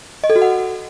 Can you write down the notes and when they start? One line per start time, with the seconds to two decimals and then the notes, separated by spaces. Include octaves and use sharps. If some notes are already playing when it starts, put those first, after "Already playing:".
0.24 D#5
0.30 A4
0.36 F#4
0.42 F#5